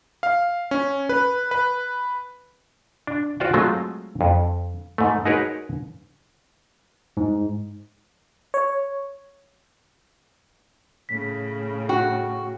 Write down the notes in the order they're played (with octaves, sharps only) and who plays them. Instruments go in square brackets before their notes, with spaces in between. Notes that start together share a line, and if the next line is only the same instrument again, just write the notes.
[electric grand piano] F5
C#4
B4
B4
[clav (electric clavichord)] D4
F4 F#4 C5 D5 F5 G5
F#3 G#3 A3 C4 F4
F2
G#2 A3
D#4 F#4 G#4 A#4 B4 C#5
[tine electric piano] G#2
[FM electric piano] C#5
[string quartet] A2 C#3 [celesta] B6
[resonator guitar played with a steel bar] F#4 [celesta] G5